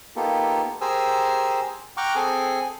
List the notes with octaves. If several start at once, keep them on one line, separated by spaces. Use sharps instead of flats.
A#3 B3 D#4 F4 G4 A4
G4 G#4 A#4 C5 G#5 E6
F#5 G5 A#5 C#6 D6 F6
C4 G#4 A4 G#5